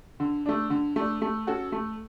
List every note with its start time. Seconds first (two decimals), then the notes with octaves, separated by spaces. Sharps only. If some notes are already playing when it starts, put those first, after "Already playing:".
0.20 D3
0.46 A3 D4
0.70 D3
0.96 A3 D4
1.22 A3
1.47 C#4 F#4 A4
1.72 A3